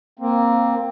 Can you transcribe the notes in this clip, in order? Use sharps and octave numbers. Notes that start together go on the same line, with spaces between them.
A#3 C4